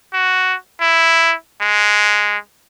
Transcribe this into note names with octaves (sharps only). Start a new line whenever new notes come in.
F#4
E4
G#3